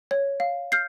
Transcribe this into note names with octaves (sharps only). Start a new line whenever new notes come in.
C#5
F5
F6 G6 C7